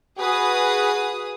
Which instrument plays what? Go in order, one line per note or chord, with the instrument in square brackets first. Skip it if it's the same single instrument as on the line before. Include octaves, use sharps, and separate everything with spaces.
[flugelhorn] F#4 [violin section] G#4 B4 D#6